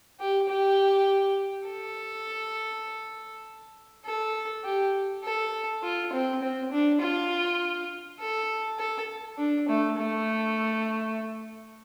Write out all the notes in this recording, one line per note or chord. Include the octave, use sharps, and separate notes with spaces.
G4
G4
A4
A4
G4
A4
F4
C4
C4
D4
F4
A4
A4
D4
A3
A3